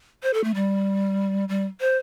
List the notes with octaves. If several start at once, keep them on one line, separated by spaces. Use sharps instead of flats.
C5
A4
A3
G3
G3
C5